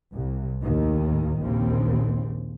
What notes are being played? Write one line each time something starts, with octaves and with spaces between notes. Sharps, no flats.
C2
D#2 A2 D#3
A#1 D#2 C#3 C4